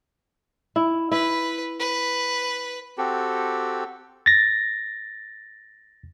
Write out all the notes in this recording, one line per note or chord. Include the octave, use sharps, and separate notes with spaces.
E4
E4 B4
B4
C4 F#4 G4 A4
A6 A#6